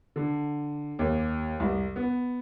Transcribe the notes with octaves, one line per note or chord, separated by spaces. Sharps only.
D3
D#2
C2
B3